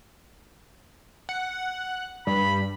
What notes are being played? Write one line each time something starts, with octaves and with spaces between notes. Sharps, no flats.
F#5
G2 B5